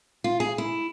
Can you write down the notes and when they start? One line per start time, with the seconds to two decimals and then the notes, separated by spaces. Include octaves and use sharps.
0.24 F4
0.40 G#4
0.58 E4